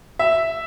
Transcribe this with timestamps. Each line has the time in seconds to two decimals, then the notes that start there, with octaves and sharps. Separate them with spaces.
0.19 E5